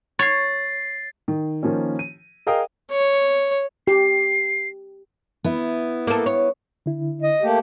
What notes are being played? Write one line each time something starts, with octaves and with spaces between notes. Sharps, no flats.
C#5 A6 C7
D#3
D#3 F3 A#3 C#4
D#7
G#4 A#4 D#5 F5 G5 D#6
C#5
G4 C7
B3 E4
A#3 A4
C#5
D3 E4
D#5
A3 A#3 G4